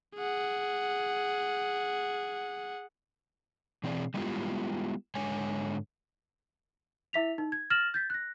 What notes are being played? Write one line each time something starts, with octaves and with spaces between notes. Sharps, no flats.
G#4 F#5
B2 E3 C4 G#4 D5
G3 G#3 B3 E4 F4 G4
G#2 D3 G#3 C#5 G#5
E4 E5 B6 F7
D#4
G#6
F6 A6 A#6 E7 F#7
G6 A6 B6
F#6 A#6